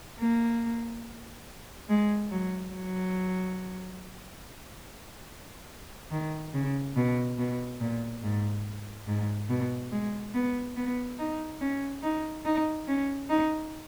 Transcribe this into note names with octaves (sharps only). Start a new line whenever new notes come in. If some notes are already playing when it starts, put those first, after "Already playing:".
A#3
G#3
F#3
F#3
D#3
C#3
B2
B2
A#2
G#2
G#2
B2
G#3
B3
B3
D#4
C#4
D#4
D#4
C#4
D#4